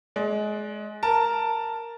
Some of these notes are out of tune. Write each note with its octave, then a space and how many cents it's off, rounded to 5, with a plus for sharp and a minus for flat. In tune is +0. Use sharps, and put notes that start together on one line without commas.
G#3 +25 D5 +0
A#4 +0 A5 +10